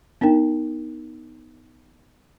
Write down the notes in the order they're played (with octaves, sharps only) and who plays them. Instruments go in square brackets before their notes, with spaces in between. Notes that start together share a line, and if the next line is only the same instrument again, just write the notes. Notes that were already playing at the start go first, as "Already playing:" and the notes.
[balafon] B3 D4 D#4 A#4 G5